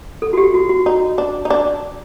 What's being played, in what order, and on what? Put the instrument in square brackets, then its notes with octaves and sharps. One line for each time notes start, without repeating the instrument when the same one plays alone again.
[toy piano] A4
F#4
G4
F#4
F#4
[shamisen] D#4
D4
D#4
D4